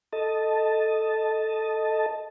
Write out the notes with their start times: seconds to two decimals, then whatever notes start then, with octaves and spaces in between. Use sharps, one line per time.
0.13 A4 D#5 A5